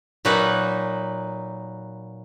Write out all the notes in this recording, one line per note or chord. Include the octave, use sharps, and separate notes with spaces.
A#2 F#3 A#3 D#4 B4